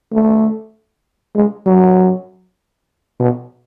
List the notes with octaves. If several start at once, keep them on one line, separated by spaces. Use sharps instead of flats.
A3
G#3
F#3
B2